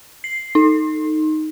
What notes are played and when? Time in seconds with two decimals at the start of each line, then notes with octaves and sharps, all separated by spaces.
0.24 C7
0.55 D#4